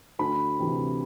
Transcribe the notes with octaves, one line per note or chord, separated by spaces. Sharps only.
D2 B5
C3 E3